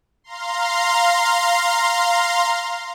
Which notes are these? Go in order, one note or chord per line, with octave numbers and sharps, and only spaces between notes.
F5 A#5 C6